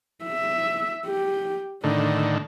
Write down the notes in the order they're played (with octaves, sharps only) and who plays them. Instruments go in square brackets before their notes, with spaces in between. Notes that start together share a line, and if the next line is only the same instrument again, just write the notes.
[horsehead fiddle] E5
G4
[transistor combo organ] A2 D3 D#3 [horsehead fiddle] D4